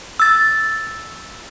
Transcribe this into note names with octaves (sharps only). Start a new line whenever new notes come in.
E6 A6